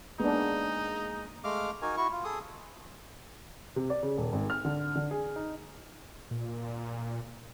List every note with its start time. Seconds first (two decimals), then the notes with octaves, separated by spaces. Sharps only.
0.20 G#3 A#3 B3 D4 D#4 G#4
1.44 G#3 A3 F5 D6 F6
1.82 D#4 F#4 A#4 G#5
1.97 E4 F#4 C#6
2.12 F4
2.24 G#4 A4 D#6
3.76 C3
3.90 D5
4.03 C#3
4.18 D#1
4.33 G#1
4.50 F6
4.65 D3
4.95 D3
5.11 G#4
5.36 D#4
6.31 A#2